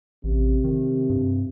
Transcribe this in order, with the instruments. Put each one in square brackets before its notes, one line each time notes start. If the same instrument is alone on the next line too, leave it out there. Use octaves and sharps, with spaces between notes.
[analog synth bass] A1 [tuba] C3
[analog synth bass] D#3
G2